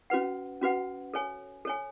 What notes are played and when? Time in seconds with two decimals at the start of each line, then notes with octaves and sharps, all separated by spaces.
0.10 C#4 F#4 B4 F#5
0.61 C#4 F#4 B4 F#5
1.14 A4 C#5 G#5
1.65 A4 C#5 G#5